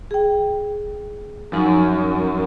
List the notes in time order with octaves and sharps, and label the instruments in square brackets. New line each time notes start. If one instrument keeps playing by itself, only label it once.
[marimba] G#4 G5
[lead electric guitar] F#2 [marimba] F3 D#4